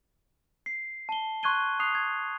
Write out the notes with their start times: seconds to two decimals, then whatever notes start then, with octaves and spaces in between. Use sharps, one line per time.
0.66 C7
1.09 A5 G7
1.43 C6 C#6 F#6 G#6 D#7 G7
1.80 D#6 F#6 C7 F7
1.95 G#6